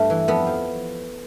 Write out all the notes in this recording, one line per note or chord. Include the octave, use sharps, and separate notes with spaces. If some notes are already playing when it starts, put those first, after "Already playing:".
Already playing: G2 A3
E3
F2 B3
F3